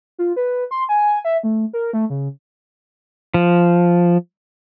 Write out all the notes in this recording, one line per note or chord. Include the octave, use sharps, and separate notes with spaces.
F4
B4
C6
G#5
E5
A3
A#4
A3
C#3
F3